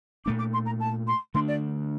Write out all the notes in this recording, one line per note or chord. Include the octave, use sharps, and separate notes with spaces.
A#2 A3 D4 D6
D6
C6
A#5
A5
C6
D3 A3 D4 C6
D5